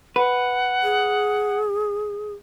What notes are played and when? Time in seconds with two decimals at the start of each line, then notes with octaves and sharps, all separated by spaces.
0.16 B4 F#5
0.83 G#4